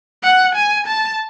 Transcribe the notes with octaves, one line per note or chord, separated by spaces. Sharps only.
F#5
G#5
A5